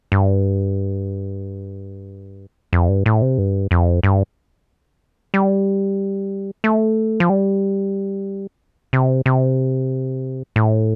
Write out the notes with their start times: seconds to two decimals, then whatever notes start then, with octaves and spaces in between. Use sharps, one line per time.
0.12 G2
2.73 F2
2.89 G2
3.06 A2
3.22 C3
3.38 G2
3.71 F2
4.03 G2
5.34 G3
6.64 A3
7.20 F3
7.30 G3
8.93 C3
9.26 C3
10.56 A2